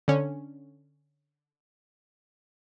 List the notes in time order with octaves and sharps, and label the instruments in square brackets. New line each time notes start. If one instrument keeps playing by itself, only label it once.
[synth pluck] D3 C#4